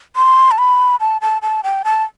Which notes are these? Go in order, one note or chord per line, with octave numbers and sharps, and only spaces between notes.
C6
A5
B5
A5
A5
A5
G5
A5